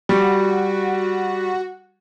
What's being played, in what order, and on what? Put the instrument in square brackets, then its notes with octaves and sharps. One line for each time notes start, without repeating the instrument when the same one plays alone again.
[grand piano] G3 [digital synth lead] F#4